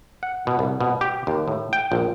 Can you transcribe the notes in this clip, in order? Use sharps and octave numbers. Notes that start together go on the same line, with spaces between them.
F#5
B2
C2
B2
G4
D#2
A2
G5
A#1